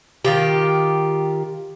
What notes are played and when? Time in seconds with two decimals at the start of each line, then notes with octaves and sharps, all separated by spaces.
0.25 D#3 F4 G4